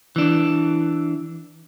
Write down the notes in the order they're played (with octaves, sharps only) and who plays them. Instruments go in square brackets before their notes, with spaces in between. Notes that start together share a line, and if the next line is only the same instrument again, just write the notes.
[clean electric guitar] E3 D4